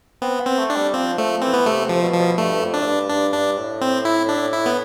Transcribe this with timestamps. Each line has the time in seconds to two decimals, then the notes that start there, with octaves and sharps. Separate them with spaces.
0.22 B3 C4
0.40 B3
0.46 C4
0.58 A3
0.70 D4
0.76 G3
0.94 F3 C4
1.18 F3 A3
1.42 E3 C4
1.54 B3
1.66 C3 A3
1.84 C3
1.89 F3
2.02 B2
2.13 F3
2.19 B2
2.38 G2 A3
2.61 F2
2.74 D4
2.81 A2
2.85 G2
3.09 G2 D4
3.33 G2 D4
3.57 A2
3.81 C4
4.05 E4
4.29 D4
4.53 E4
4.66 B3